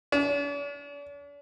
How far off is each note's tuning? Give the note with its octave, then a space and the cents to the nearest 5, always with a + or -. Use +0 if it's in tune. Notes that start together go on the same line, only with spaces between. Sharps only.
D4 -45